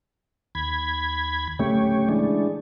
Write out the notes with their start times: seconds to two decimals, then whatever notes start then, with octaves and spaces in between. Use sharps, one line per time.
0.55 D#2 B5 G#6
1.59 D1 C#3 A3 G4 C#5
2.09 E3 G#3 D4